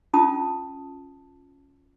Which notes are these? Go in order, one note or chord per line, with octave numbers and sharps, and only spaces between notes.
C#4 F4 A5 D#6